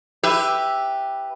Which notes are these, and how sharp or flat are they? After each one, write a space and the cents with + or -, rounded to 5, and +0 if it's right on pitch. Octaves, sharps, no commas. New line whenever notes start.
G4 +5 B4 +0 E5 +0